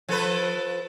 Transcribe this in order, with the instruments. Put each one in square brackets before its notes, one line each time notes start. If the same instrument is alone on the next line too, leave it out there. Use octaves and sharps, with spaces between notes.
[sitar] F3 A4 B4